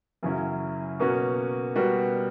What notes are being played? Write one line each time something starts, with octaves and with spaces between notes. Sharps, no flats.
F#2 C#3 F#3 C#4 E4
B2 A#3 C#4 F#4
B2 G3 B3 F#4 A#4